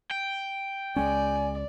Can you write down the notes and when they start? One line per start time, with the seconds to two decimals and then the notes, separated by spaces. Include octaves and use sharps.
0.11 G5
0.96 C#2 G#3 C#4 D5 G#5